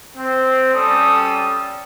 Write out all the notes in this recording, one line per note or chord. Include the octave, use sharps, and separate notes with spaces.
C4
G3 C#4 A4 D#6